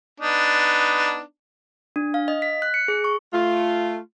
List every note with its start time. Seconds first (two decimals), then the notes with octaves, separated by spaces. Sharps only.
0.20 B3 D4 D#4
1.96 D4
2.14 F5
2.28 D#5
2.42 B6
2.62 F#6
2.74 C#7
2.88 G#4
3.04 C#6
3.33 A3 F4